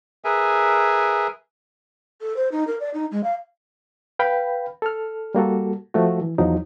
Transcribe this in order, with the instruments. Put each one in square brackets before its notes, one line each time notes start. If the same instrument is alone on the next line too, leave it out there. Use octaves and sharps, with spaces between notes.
[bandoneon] G#4 A#4 B4 E5 G#5
[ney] A4
C5
D#4
A#4
D5
D#4
G#3
F5
[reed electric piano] B4 F5 G5 B5
A4 F6
G3 A#3 F#4 A4
F3 A3 F#4
E3
E2 F3 F#3 D#4